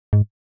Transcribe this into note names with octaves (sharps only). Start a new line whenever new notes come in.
G#2